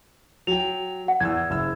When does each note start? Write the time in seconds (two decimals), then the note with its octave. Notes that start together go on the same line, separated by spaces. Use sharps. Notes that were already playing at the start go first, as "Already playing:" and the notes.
0.47 F#3 G5 F7
1.08 F#5
1.20 E2 E6 G#6
1.50 F#1 E6